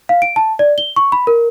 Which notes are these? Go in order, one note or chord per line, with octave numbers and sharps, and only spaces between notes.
F5
D7
A5
D5
G7
C#6
B5
A#4